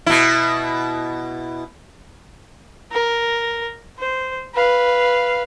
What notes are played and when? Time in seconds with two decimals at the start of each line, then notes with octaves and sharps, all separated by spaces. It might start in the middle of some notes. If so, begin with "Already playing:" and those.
0.06 B2 E4
2.91 A#4
3.99 C5
4.54 B4 F5